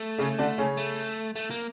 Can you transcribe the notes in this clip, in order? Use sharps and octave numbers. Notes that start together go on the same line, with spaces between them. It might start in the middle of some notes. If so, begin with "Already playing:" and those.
Already playing: A3
C#3 C#4
D3 D4
C#3 C#4
A3
A3
A#3